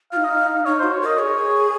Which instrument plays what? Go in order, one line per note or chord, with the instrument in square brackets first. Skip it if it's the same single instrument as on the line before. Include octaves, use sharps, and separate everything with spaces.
[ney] F4 [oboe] F5
[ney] D#4
[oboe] D#5
F5
F5
[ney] D#4 [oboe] C#5
[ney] F#4 [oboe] C5
[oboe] C#5
[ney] A#4 [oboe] D#5
[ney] G#4 [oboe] C#5